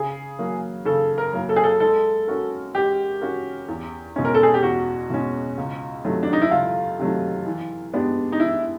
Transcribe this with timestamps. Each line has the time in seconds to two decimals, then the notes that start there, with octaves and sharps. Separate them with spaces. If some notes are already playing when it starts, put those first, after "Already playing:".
Already playing: C#3 G#4
0.39 F#3 A#3
0.85 C#3 A4
1.18 A#4
1.33 F#3 A#3
1.49 A4
1.56 G#4
1.64 A4
1.80 G#3 A4
2.28 C#4 F#4 A#4
2.75 G#3 G4
3.21 C#4 F#4 A#4
3.68 E2
4.16 B2 G#3 C#4
4.25 A#4
4.34 A4
4.43 G#4
4.54 G4
4.62 E2 F#4
5.10 B2 G#3 C#4
5.58 C#2
6.05 C3 D#3 F#3 A3
6.23 D4
6.33 D#4
6.42 E4
6.51 C#2 F4
6.99 C3 D#3 F#3 A3
7.46 E3
7.93 G#3 B3 D4 G4
8.32 D#4
8.40 E3 E4